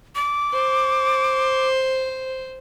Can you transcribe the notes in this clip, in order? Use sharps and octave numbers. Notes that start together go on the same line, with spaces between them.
D6
C5